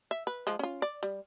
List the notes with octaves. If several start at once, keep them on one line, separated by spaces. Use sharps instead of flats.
E5
B4
F3 G#3
C#4 F4
D5
G3